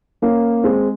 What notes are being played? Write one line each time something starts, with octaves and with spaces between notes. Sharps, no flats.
A#3 C#4
G#3 C4